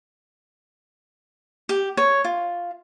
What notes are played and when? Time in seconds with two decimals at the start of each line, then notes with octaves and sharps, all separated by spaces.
1.69 G4
1.97 C#5
2.24 F4